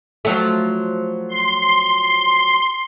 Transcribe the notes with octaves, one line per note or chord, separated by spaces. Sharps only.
F3 F#3 A3
C6